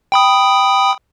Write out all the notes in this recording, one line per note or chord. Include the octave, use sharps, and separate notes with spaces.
G5 B5 D#6